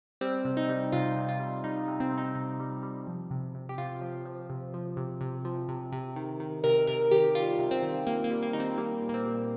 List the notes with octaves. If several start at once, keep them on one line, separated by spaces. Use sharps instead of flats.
G3 C4
C3
D#4
G3
C3 F4
C3
F4
G3
G3 D#4
C3
C4
C3
D#4
C3 D#4
G3
G3
F3
C3
C3
G4
C3 F4
F3
F3
C3
F3
C3
C3
F3
C3
C3
D#3
D#3
C3 A#4
C3 A#4
D#3 G4
G3 F4
C3
C4
D#3
C3 A#3
A#3
G3
A#3
D#3 D#4
C4
G3 A#3
A#2
A#3
C4
G3